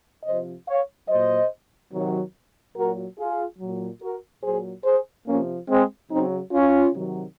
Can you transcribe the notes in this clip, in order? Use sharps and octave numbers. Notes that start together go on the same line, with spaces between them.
C3 F3 C5 D#5
C#5 F5
A#2 F#3 C5 D#5
C3 D#3 F#3
A#2 F#3 F#4 A#4
F4 G#4
A#2 F#3
F#4 A#4
A#2 F#3 G#4 C5
G#4 C5
C3 F3 A#3 C#4
G#3 C4
C#3 F#3 C4 D#4
C#4 F4
C3 D#3 F#3